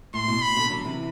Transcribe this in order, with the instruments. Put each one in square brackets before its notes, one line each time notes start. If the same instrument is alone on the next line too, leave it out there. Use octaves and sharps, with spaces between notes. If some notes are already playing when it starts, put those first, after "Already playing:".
[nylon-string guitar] A2 [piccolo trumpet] C6
[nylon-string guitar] B2
[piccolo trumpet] B5
[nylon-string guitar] B2 D3
D3 F#3
C3 E3